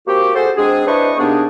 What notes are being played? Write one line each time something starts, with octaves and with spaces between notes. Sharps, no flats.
A#3 C4 F#4 G4
F#4 G#4 A4 C5
G#3 C4 D4 G#4
D4 E4 B4 C5 D#5 C#6
C3 A#3 B3 D4 D#4 G#4